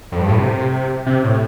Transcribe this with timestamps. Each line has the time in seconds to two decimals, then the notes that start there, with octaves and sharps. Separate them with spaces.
0.12 F2
0.20 G2
0.28 A2
0.38 C3
1.06 C3
1.24 A2